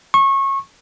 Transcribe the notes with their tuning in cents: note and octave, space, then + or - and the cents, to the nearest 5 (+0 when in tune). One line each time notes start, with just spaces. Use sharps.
C#6 -25